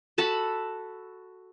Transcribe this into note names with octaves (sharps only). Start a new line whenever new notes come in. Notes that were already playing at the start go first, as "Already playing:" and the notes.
F#4 A4 A5 B5